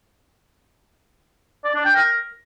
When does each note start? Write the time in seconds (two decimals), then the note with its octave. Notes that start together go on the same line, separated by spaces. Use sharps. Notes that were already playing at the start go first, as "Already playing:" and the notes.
1.64 D5
1.75 D4
1.85 G5
1.96 A#4